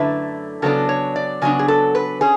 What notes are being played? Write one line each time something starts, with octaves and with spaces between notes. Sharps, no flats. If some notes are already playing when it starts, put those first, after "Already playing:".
Already playing: F#2 D3 A3 E4 B4
C#3 F#3 B3 D4 A4
C#5
D5
C#3 F#3 B3 D4 G#5
G#4
A4
B4
C#4 G#4